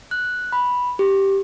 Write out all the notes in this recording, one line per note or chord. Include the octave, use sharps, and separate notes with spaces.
F#6
B5
G4